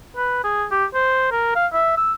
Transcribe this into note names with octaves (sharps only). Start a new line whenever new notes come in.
B4
G#4
G4
C5
A#4
F5
E5
E6